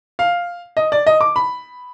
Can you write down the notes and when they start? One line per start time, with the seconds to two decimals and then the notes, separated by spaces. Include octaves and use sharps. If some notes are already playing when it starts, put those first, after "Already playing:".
0.19 F5
0.77 D#5
0.92 D5
1.07 D#5
1.21 D6
1.36 B5